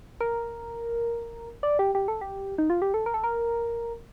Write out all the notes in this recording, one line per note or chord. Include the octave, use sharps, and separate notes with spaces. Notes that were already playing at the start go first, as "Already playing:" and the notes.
A#4
D5
G4
G4
A4
G4
D#4
F4
G4
A4
A#4
A4
A#4